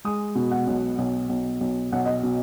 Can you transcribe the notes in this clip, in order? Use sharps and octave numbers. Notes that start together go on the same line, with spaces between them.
G#3 D#6
B2
F#5
B1
B1
B1
B1
B1 F#5
D#5
B2